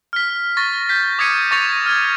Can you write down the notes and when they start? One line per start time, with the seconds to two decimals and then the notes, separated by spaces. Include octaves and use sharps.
0.13 F6 B6
0.57 C#6 A6 A#6
0.89 G6 B6
1.19 D6 D#6 G#6 B6 C#7 D#7
1.51 C#6 D6 A6 A#6 C#7 F7
1.86 F6 G#6